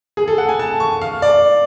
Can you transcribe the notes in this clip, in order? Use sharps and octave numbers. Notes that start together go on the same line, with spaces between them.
G#4
A4
F#5
G#5
A5
C#6
F5
D5